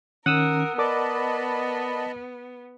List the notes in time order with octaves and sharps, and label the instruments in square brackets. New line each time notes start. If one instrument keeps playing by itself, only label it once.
[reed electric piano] D#3 C#4 [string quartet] A#4 [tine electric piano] F#5 D#6 E6
[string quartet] B3 [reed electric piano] A#4 D5 D6 [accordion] D#5 A5 B5